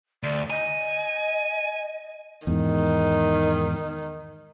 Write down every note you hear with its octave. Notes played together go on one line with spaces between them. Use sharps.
D2 D5
D#5 G#5
E2 G#2 D#3